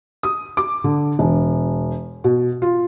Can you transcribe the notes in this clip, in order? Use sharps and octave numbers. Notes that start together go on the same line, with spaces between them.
D#6
D6
D3
E1
B2
F4